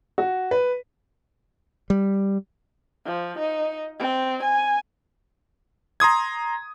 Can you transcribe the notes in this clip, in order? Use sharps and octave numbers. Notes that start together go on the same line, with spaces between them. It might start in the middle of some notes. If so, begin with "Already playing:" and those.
F#4
B4
G3
F3
D#4
C4
G#5
A#5 C6 D#6 G#6